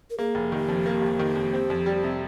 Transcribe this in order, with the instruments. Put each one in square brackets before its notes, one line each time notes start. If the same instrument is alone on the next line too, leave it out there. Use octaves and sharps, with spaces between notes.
[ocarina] A#4
[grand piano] A#3 [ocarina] G#4
[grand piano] F1
[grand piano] D#3 [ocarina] G4
[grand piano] F2
A#3
F1
D#3
F2
C4
F2
G3
C3